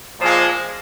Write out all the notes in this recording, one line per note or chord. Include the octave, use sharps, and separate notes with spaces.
A#2 F3 G#3